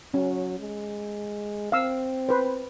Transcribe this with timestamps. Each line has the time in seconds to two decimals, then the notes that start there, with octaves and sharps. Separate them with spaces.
0.14 F#3 C#4
0.60 G#3
1.72 C4 F5 E6
2.29 B4 C5